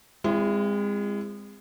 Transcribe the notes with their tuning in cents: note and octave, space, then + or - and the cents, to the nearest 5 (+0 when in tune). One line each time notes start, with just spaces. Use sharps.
G#3 -30 C4 -5 E4 +30